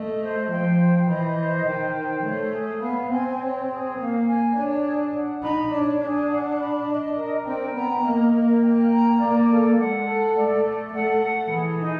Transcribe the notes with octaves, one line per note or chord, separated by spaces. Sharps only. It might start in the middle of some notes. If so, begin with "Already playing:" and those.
Already playing: A3 D#5
C5
F3 G5
C5
E3 D#5
C5
D#3 G5
C5
A3 C#5
G#4
B3 F5
C4 G#5
C#5
G#4
A#3 F5
G#5
D4 C#5
G#4
F#5
D#4 B5
D4 C#5
D4 G#4
F#5
B5
D#5
A#4
C4 G5
B3 A#5
A#3 D#5
A#4
G5
A#5
A#3 D5
A4
G#3 F#5
A4
A3 D5
A4
A3 F#5
A4
E3 G#4
D#4